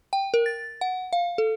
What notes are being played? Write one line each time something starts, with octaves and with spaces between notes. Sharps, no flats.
G5
A#4
A6
F#5
F5
A4